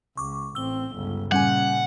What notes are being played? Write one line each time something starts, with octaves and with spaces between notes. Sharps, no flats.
C#2 C#6 D6
A1 C4 E6 G7
G1 C#2
A#2 C#3 G3 C#4 F#5 G#5